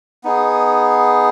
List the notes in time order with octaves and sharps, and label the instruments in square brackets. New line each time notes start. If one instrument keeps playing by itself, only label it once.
[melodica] B3 D#4 G#4